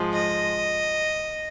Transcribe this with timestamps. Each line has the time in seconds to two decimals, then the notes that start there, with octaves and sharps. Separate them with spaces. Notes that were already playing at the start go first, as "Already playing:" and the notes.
Already playing: G#2 F3 G#3
0.13 D#5